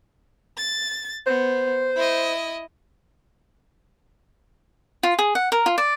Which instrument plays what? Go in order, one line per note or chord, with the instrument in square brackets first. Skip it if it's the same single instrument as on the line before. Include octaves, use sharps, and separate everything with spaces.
[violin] A6
[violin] B3 [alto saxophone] C5
[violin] E4 D#5
[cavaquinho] F4
G#4
F#5
A#4
F4
D5